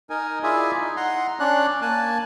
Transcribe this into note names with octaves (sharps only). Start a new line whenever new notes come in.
D#4 A#4 G#5
E4 F4 G#4 D5 E5 G#5
D#4
F#5 A#5 C6
C#4 D4 D5 F#6
A#3 G#5 A5 F#6